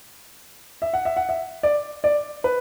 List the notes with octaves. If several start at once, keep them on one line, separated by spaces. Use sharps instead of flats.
E5
F#5
E5
F#5
E5
D5
D5
B4